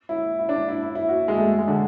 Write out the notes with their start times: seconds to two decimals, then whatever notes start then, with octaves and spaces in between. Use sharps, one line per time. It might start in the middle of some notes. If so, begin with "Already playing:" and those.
0.09 E4
0.39 E4
0.49 D4
0.69 E4
0.82 E4
0.95 E4
1.09 F#4
1.28 G#3
1.38 A3
1.59 G#3
1.68 D3